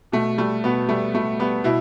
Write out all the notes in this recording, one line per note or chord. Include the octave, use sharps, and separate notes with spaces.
B2 A3
G3 A3
B2 B3
G3 A3
B2 A3
G3 B3
B2 E4